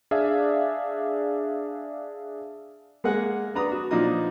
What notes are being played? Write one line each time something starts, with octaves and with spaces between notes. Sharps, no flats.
D4 G#4 D5 E5 F5
G#3 A#3 G#4 F#5
D4 B4 A#5 D#6
F#4
A#2 F3 D4 D#4 D#6